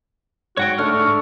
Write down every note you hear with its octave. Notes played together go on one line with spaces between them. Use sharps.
G#2 F#4 C#5 F#5 G5
D3 A3 C#6 F6